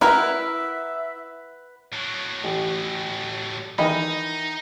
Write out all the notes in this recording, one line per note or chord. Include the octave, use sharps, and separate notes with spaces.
E4 A#4 B4 E5 F#5 A#5
A2 F#3
A1
D#3 E3 D#4 E4 D#5 B5